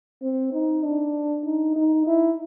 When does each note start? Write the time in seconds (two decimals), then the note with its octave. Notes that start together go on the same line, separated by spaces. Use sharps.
0.22 C4
0.53 D#4
0.83 D4
1.45 D#4
1.76 D#4
2.07 E4